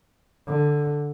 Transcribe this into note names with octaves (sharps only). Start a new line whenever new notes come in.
D3